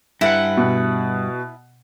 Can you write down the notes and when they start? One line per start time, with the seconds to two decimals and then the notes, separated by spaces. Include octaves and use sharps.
0.21 G2 E4 B4 F#5
0.57 B2